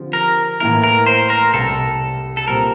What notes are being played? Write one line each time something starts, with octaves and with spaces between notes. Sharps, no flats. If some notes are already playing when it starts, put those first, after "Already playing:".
Already playing: D3 F3 C4 G4
A#4
A2 E3 A#3 E4 A#4
A#4
C5
A#4
C2 C3 G3 A4
A4
A#2 G3 C4 G4 A#4